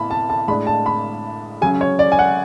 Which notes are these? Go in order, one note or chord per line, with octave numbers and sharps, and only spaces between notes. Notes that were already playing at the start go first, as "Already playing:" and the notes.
Already playing: A2 B3 E4 A5 B5
A5
A5
A2 G#3 D4 B5
A5
B5
C#3 F#3 C#4 G#5
C#5
D5
G#5
F#5